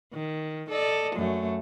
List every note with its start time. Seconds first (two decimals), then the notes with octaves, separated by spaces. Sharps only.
0.13 D#3
0.70 A4 D5 D#5
1.15 F#2 A3